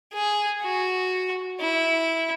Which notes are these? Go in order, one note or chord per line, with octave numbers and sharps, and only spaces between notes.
G#4
F#4
E4